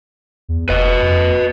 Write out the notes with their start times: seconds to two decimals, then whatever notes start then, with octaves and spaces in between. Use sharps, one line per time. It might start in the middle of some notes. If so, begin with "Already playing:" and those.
0.49 E2
0.69 F1 B4 D#5
1.01 F2